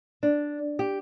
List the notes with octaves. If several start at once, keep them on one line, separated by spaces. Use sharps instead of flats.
D4
G4